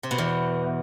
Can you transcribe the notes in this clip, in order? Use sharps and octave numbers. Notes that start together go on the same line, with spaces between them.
C3
B2
E2